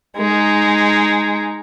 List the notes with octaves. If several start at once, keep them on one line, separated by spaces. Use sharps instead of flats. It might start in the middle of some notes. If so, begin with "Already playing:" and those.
G#3 D#4